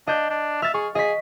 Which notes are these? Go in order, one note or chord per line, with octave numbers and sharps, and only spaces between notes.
D4 D#5 G6
D4
E5 F6 A6
G#4 C#6
G#4 D#5 B6